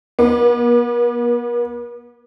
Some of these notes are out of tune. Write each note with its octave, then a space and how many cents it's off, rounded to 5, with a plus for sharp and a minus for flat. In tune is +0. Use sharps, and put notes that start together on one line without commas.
B3 -45